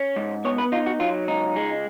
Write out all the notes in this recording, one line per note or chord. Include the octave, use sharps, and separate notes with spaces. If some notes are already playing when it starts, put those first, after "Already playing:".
Already playing: C#4
G#2
B3 C#5
B4
D#4 F4
F#4
F#3 F4
C#2 D#4
G#3